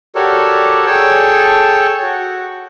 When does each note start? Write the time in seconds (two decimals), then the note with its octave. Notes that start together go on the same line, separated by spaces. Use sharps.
0.15 F#4 G4 A4 A#4 C#5 D5
0.86 G#4 A4 C#5 G5 A5
2.02 F#4